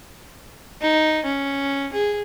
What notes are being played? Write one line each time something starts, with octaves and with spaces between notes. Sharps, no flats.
D#4
C#4
G#4